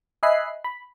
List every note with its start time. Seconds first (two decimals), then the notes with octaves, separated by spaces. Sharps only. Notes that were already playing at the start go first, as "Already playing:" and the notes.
0.23 D#5 E5 G#5 B5 F#6 C7
0.64 B5